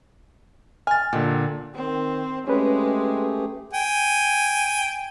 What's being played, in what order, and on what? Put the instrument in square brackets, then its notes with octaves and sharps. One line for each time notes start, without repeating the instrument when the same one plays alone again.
[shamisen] G#5 [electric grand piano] F6 A6
[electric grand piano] A#2 D3 [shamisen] G4 D#5
[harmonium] D#3 [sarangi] C4
[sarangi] G#3 [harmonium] A3 G4 G#4 [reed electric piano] C#4 B4
[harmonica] G5 G#5